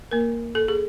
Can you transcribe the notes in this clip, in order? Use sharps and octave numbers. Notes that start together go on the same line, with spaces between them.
A#3 A#4
A4
G#4